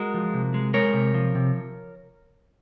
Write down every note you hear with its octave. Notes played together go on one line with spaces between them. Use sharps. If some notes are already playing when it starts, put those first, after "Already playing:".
Already playing: G#3 F#4 A#4
F3
C3
G#3
G#3 A#4 C#5
C3
F3
C3